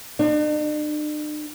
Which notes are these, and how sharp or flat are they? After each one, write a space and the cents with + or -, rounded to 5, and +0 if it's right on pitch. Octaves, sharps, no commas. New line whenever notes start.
D4 +45